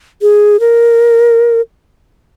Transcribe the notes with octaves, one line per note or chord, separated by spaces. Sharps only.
G#4
A#4